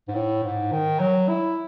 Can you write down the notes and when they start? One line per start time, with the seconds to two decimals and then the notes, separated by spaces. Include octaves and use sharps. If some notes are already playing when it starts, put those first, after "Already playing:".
0.08 G#2
0.15 A2
0.44 G#2
0.72 D#3
1.00 F#3
1.29 E4